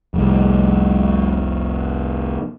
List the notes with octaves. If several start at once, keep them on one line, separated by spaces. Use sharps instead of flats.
F1 C2